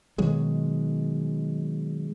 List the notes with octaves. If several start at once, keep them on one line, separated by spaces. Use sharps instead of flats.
B2 D#3 F#3 G#3